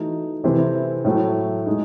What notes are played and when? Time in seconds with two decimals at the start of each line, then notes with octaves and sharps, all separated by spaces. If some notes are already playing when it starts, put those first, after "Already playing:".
Already playing: E3 A3 D#4 F#4
0.44 C3 E3 A3 C4 E4
1.04 A2 F#3 A3
1.66 A2 G#3 D#4